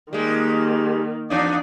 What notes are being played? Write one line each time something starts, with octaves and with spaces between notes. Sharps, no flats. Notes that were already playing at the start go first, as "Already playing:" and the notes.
D#3 G3 G#3 A#3
E2 D4 D#4 D5